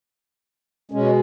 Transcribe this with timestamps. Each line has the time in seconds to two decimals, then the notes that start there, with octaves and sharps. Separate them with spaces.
0.91 B2 G#3 C#4